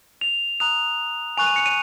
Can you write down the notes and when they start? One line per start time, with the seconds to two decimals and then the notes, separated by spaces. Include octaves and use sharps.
0.21 F7
0.60 A#5 D#6 F#6 F7
1.37 G#5 C#6 F#6 F7
1.46 D#7
1.56 C#7
1.66 D#7